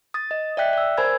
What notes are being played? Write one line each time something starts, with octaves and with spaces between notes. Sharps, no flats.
D#6 A6
D#5
D5 E5 G5 F#6 B6
D5 E6
A#4 C5 G#5 B5 E6 G#6